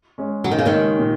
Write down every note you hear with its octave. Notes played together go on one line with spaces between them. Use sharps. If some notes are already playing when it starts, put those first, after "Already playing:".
G#3 C#4
C#3 F#3
D#3
C#3
D#2 D#3
G#3 C#4
A#2